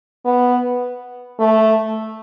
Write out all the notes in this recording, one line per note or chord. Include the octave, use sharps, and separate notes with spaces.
B3
A3